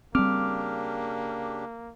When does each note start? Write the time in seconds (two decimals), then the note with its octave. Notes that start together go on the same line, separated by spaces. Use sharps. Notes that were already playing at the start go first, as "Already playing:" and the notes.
0.15 C#3 G3 A#3 C4 D4 G4 D6 F6